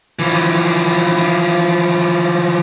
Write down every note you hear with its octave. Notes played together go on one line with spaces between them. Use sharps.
E3 F3